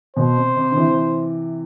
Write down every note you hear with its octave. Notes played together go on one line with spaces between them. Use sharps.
B2 C5
C3
C3
D3
C3 E3